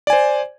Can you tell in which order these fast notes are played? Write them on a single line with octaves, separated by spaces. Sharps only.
D5 G#5 C5